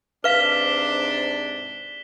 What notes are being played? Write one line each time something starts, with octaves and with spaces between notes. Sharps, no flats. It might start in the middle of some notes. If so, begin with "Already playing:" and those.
G#2 C3 D4 B4 F5 B6 E7 G7